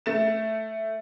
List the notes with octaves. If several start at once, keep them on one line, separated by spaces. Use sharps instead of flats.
A3 A6 E7